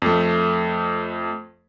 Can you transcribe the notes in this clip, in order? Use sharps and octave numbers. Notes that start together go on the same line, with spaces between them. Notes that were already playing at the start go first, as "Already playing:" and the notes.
F2 A3